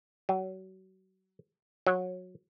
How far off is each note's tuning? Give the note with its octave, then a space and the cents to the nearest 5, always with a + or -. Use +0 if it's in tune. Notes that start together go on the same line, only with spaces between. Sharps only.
F#3 +30
F#3 -20